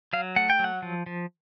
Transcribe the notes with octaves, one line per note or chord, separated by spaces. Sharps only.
F#3 F5
A3 F#5
G5
F#3 F#5
F3
F3